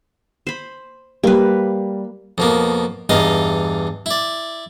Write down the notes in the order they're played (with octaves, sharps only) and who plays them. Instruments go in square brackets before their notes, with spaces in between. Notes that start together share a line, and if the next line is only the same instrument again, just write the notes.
[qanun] C5 B5
[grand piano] G3 [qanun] A#3 B4
[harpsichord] F2 B2 A#3
E2 G2 D#4 D#5 F5
E4 D5